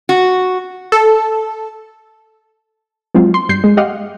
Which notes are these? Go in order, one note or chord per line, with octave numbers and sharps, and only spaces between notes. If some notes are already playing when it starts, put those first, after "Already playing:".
F#4
A4
F#3 G#3 C4 F4
C6
G2 G6 C7
G#3
G4 D#5 F5 F#5